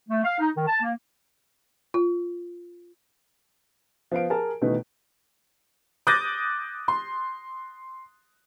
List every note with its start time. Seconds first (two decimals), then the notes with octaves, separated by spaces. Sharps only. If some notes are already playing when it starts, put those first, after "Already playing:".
0.09 A3
0.24 F5
0.39 D#4
0.56 D#3
0.67 A5
0.82 A#3
1.94 F4
4.12 F3 B3 F5 D7
4.30 G#4 A#4 G#5 A5
4.62 B2 D#3 E3 A3 B3 D#4
6.07 D6 D#6 F#6 G6 A6 A#6
6.88 C6